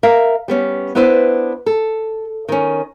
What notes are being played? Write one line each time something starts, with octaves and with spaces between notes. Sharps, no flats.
A#4 E5 F5
G3 B3 C#4
B3 D4 E4 B4 C5
A4
D#3 C#4